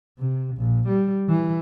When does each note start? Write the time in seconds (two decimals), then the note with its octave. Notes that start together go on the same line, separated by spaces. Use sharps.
0.19 C3
0.57 A#1
0.88 G3
1.29 E3